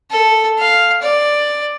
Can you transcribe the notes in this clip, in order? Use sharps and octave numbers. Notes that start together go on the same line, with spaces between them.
A4
F5
D5